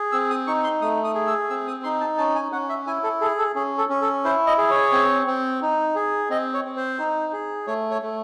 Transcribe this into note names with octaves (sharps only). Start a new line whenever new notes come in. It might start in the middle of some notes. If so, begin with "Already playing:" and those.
Already playing: G#4
C4 E6
D#6
D#4 C#6
C6
A3 D#6
D#6
G#4
E6
C4 E6
D#6
D#4 C6
A5
C#4 A5
G#5
C#4 F#5
E5
E4 G#5
A4
G#4 A4
A4
C#4 G#4
A4
C#4
A4
E4 C5
D#5
G#4
C#5
C4
C4
D#4
G#4
C4 D#5
C#5
C4
C5
D#4
G#4
A3 C#5
C#5
A3